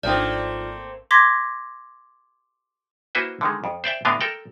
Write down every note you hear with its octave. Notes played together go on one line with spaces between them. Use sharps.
G#1 F3 A3 A#3 C4 D#4 F4 D5
C6 D6 G#6 A#6 B6
A#3 E4 F#4 B4 C5 E5
D3 D#3 G#3
F2
C5 D5 E5 G5
A2 D3 B3 D4 D#5 F5
A4 A#4 G5